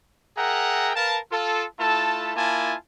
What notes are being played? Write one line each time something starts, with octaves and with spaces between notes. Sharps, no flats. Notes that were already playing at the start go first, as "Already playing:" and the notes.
G#4 A#4 E5 F#5 G5 A#5
A#4 B4 F5 A5
F4 A4
A3 E4 F4 A4 A5
A#3 E4 F4 G#5 A5